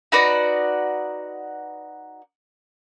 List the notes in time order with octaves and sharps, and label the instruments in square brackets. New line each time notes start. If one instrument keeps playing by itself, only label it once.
[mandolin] D#4 F#4 B4 D5